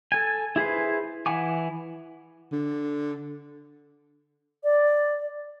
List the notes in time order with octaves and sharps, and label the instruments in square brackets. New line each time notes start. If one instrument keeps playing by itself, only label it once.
[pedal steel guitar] A4 G#5
E4 G#4 B4 C5
E3 E4 F#5 G#5 D6
[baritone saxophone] D3
[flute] D5